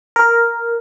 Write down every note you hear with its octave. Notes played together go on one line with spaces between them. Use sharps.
A#4